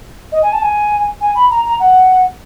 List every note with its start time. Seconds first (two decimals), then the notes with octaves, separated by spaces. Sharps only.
0.32 D#5
0.42 G#5
0.53 A5
0.62 G#5
1.21 G#5
1.35 B5
1.51 A#5
1.66 A#5
1.80 F#5